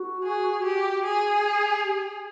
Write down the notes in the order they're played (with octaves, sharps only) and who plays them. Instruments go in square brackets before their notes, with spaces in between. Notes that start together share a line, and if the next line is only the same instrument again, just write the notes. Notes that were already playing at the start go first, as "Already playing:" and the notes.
Already playing: [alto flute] F#4
[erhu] G#4
[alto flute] F#4 [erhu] G4
[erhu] G#4
[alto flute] G4